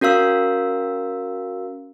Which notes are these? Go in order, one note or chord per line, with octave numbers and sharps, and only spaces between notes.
C#4 F#4 A#4 F5 E6